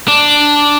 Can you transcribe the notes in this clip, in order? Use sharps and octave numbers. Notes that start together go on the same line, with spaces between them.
D4